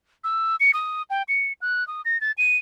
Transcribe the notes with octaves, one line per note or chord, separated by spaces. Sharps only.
E6
C#7
D#6
G5
C#7
F#6
D#6
A#6
A6
D#7